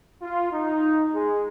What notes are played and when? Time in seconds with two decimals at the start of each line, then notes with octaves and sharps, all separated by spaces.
0.22 F4
0.52 D#4
1.13 G#3